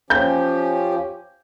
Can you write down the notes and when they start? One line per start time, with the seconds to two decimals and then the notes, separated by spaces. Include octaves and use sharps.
0.10 F3 C#4 G4 G6